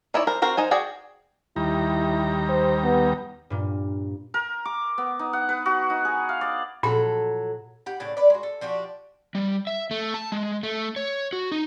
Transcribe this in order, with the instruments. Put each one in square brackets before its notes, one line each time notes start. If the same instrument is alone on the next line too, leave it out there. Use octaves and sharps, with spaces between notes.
[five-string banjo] D#4 E4 C#5 D5
A#4 C5
C4 F#4 A#4 C5
D#4 C5 G#5
F#4 G#4 D5 G5
[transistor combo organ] D#2 G3 A#5 [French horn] E4
[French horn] C5
B3
[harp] G2 A#2
[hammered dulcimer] A#4
D6
B3
D#4
F#5
B4
F#4
D#4
G#4
F5
D5
[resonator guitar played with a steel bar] F2 F#3 A4 [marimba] A#2
[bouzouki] G4 F#5
A2 C#3 D4
B4 D5
G#3 F#4
A4
F3 D4 F#4 G4
[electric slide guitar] G3
E5
A3
A5
G#3
A3
C#5
F#4
D#4